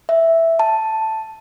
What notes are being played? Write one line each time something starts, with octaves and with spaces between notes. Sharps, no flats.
E5
A5